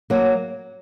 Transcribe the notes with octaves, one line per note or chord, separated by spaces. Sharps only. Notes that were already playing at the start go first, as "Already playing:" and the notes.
F#3 A#3